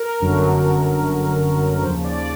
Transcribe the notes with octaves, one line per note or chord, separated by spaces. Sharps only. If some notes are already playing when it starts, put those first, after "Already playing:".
Already playing: A#4
G1 F#2 D3 F#3
D#2 C#3 F3 C5
D5